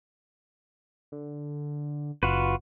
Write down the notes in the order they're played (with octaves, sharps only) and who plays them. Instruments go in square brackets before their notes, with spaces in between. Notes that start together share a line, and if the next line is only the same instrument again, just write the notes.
[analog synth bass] D3
[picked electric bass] F#1 [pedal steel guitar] F4 F#4 B4